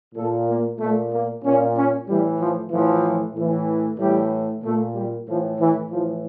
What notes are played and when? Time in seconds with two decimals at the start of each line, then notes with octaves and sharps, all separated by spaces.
0.14 A#2 A4
0.46 A#3
0.78 A#2 A3
1.10 A#3
1.42 A#2 C#4
1.74 C#4
2.06 A2 E3 G3
2.38 F3
2.69 A2 E3 F3
3.34 A2 E3
3.97 A2 E3 G3
4.62 A#2 A3
4.93 G3
5.26 A2 E3 F3
5.58 E3
5.90 A2 E3 F3